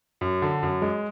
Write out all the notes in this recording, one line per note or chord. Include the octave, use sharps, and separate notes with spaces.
F#2
D3
F#2
G#3